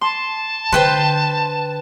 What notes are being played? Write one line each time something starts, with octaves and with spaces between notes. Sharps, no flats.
A5 C6
D3 B4 C5 G5 C6